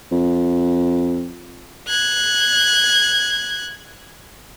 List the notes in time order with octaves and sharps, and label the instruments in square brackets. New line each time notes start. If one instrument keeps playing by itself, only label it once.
[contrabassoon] F2
[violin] F#6 G#6